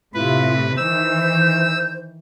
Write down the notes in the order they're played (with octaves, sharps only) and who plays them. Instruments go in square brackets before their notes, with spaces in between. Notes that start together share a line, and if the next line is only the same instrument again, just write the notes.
[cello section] A2 C3 [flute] E4 [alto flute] F4 [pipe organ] B4
[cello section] D#3 E3 [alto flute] C5 [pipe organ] E6 [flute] G6